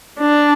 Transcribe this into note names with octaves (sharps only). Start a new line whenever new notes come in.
D4